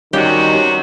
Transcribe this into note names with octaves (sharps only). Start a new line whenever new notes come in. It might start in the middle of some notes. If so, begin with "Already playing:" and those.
C3 D#3 G3 C#4 D#4 F#4 G4